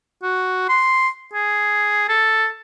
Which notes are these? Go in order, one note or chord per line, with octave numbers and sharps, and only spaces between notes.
F#4
C6
G#4
A4